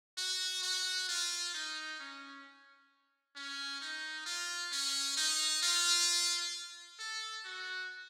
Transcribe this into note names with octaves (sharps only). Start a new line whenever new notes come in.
F#4
F#4
F4
D#4
C#4
C#4
D#4
F4
C#4
D#4
F4
A4
F#4